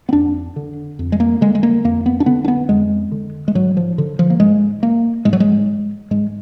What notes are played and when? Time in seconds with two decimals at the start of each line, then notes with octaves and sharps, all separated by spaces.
0.09 B3
0.13 F2 D4
0.56 D3
0.99 F2
1.12 G#3
1.20 A#3
1.41 D3 G#3
1.55 G#3
1.63 A#3
1.84 F2 A#3
2.06 B3
2.20 D4
2.26 D3 B3
2.44 D4
2.48 B3
2.69 F2 G#3
3.12 D3
3.48 G#3
3.55 G#2 F#3
3.77 F3
3.98 D3
4.19 F3
4.30 A#3
4.40 G#2 G#3
4.83 A#3
5.25 G#2 G#3
5.33 F#3
5.40 G#3
6.11 G#2 G#3